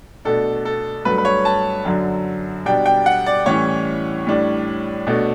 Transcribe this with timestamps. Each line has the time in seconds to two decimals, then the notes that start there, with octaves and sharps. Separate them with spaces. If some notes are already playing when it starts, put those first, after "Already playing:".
0.25 B2 A3 D4 A4
0.65 A4
1.05 G2 F#3 A3 B4
1.18 B4
1.25 C#5
1.45 A5
1.85 F#2 D3 F#3
2.66 B2 G3 D4 G5
2.86 G5
3.06 F#5
3.26 D5
3.46 A2 E3 G3 C#4 C#5
4.27 A2 G3 D4
5.07 B2 A3 D4